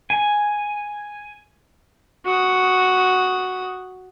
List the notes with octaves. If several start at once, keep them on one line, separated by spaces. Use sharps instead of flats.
G#5
F#4 D#6